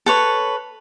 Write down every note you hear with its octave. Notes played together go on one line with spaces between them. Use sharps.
A4 B4 C#5